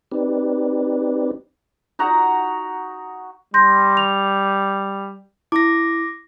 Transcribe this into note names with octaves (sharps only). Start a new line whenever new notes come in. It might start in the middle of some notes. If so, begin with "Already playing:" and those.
C4 D#4 G4 B4 D5
D#4 F#4 F#5 A#5
G3 C6 G6 A#6
F7
E4 D6 A#6